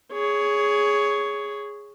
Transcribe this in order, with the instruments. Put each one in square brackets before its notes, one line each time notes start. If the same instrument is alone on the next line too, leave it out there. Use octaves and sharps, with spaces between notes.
[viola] G#4 C#5